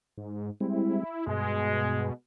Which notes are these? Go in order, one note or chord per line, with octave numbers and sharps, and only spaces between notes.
G#2
G3 G#3 C4 E4
G2 B2 G#3